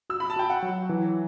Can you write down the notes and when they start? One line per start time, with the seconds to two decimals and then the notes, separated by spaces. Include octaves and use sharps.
0.09 F#4 E6
0.20 B5
0.30 A5
0.36 F#4 G5
0.50 F#5
0.62 F#3
0.89 E3